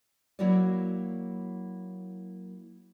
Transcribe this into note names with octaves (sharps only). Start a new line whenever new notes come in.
F#3 A#3 E4 F#4 C#5 D5